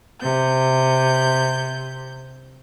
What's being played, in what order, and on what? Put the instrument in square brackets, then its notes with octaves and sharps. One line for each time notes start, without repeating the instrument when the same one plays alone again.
[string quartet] C3 G6